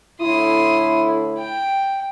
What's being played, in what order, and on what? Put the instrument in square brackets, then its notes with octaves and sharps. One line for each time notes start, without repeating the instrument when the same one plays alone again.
[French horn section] A2 D3 E4 [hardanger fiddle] C6 D#6
[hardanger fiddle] G5